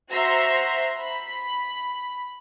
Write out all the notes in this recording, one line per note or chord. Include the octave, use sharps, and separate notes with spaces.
F#4 C5 E5 A#5 C6
B5